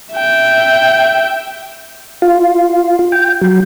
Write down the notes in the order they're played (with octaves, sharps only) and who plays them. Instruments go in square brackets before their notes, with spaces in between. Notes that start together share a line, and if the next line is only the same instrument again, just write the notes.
[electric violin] E5 G5
[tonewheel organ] F4
G5
F#3